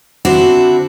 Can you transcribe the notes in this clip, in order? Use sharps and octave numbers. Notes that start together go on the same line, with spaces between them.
D3 C4 D4 E4 F#4